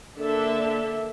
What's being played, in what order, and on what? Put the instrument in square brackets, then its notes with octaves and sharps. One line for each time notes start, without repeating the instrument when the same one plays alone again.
[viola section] D3 A#3 D4 A4 E5